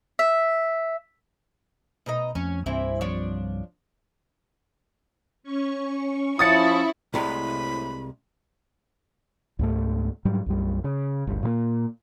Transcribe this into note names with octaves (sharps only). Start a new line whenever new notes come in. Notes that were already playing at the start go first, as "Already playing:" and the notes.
E5
B2 D#4 D#5
F2 C#4
C2 G2 C3 E3 C4 E4
F3 D4 C#5
C#4 C#6
F3 E4 D#6 A6 C#7
C2 A2 C3 G#3 B5
C#2 G#2 A3
G#2 F#3 G3
B1 F#2 G3
C#3
G1 D2
A#2 F3 A#3